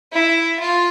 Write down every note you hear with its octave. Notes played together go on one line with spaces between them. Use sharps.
E4
F4